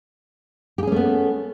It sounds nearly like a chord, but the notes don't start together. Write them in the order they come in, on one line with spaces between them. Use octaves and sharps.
G4 G#4 C#4 A3 B3